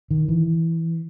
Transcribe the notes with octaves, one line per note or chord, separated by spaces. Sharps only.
D#3
E3